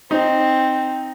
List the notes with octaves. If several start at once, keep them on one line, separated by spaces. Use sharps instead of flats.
C4 D#4